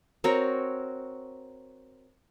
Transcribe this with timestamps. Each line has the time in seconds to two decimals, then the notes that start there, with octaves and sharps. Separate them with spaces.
0.24 C4 F#4 A#4 C#5